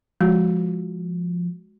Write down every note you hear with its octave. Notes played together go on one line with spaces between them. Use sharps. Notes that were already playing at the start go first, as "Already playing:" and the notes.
F3 G#3 F#4